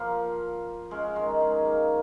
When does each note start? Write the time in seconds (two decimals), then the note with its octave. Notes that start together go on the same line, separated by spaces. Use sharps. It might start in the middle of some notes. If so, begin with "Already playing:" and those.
Already playing: F3 A#3
0.91 G#3 C#4
1.16 D#3 G#3
1.40 D#4 G#4
1.65 A#3 D#4